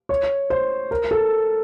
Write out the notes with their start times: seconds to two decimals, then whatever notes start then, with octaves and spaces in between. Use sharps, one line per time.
0.09 C#5
0.50 C5
0.91 A#4
1.11 A4